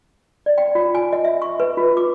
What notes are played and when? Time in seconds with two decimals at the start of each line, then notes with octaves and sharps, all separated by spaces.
0.46 D5
0.58 G5
0.75 F4
0.95 G#5
1.13 D#5
1.25 E5
1.42 C#6
1.60 B4
1.77 F4
1.97 D6